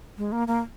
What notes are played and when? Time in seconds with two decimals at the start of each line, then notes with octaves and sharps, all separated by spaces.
0.18 G#3
0.32 A#3
0.48 A#3